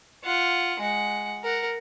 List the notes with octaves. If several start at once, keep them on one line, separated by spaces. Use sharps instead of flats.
F4 F#5
G#3 F#5
A#4 F#5